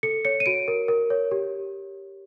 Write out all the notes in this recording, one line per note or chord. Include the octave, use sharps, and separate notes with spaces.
A4 C#7
C#5 C#7
D#7
F#4 D7
A#4
A#4
C#5
G4